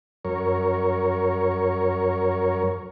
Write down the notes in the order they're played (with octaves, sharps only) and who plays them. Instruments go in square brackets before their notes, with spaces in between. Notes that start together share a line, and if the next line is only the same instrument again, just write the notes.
[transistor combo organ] F#2 A#4 C#5